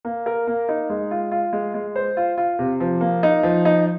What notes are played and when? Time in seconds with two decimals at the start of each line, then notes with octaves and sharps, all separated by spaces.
0.05 A#3
0.26 A#4
0.47 A#3
0.69 D#4
0.90 G#3
1.11 F4
1.31 F4
1.53 G#3
1.74 G#3
1.96 C5
2.17 F4
2.38 F4
2.59 C3
2.80 F3
3.01 A#3
3.23 D#4
3.43 F3
3.65 D#4